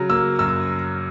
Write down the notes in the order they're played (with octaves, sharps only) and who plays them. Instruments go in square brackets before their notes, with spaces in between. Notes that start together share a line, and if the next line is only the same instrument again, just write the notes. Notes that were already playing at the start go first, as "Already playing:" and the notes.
Already playing: [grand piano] C#3 F#3
A#3 E6
F#2 E6